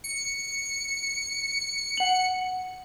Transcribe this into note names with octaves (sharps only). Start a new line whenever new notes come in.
C#7
F#5 F#7